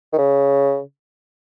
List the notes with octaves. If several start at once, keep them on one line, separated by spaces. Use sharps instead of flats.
D#3
C#3